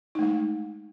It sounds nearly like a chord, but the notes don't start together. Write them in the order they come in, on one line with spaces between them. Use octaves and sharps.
D#4 A3 G#3